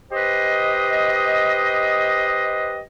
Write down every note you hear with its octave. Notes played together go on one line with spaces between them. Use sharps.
G4 B4 C5 D#5